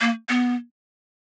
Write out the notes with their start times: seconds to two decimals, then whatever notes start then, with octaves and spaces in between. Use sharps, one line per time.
0.01 A#3
0.29 B3